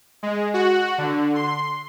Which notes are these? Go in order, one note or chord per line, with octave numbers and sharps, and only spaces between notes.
G#3
F#4
D3
C6